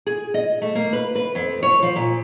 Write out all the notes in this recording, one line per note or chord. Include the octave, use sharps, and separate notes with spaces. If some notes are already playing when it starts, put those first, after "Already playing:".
G#4
D#5
A3
A#3
B4
B4
F2
C#5
F3
A#2